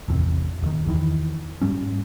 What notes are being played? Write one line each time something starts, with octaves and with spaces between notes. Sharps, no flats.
A1 E2 C3
D#1 D#3
E2 D#3 E3
G#2 G3 C#4